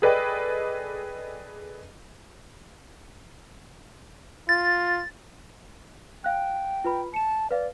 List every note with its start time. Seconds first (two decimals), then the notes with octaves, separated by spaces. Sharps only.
0.02 G#4 A4 B4 D5 D#5 G5
4.49 F4 A6
6.24 F5 G5 F#6
6.84 F4 B4 B5
7.14 A5 C#7 E7
7.51 B4 D5 F5